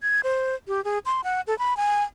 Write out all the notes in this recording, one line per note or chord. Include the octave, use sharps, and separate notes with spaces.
G#6
C5
G4
G#4
C6
F#5
A4
B5
G#5